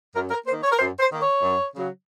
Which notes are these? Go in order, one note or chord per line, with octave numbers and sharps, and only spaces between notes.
F#2 A#4
A#4
D#3 A#3 C5
C#5
A#4
F#2 C5
C5
D#3 A#3
C#5
F#2
C#3 F#3